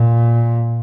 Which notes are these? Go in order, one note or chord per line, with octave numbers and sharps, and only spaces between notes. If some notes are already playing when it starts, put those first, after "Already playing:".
Already playing: A#2